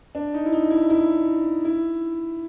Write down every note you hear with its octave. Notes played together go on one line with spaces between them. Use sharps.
D4
D#4
E4
D#4
E4
E4
E4